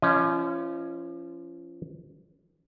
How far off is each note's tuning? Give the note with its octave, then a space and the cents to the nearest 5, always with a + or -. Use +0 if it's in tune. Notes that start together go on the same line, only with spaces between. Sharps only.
F3 -35 C#4 +0 D#5 -15